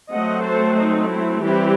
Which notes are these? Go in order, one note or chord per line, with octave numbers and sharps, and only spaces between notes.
F#3 A3 C4 D#5 F#5
A4 C5
D#4
E4
E3 G3 C4 E4 G4